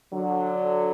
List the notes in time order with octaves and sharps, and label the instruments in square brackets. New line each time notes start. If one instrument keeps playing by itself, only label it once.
[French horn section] D3 F#3